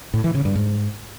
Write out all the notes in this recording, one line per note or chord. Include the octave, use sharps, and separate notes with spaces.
A2
E3
C#3
G2
G#2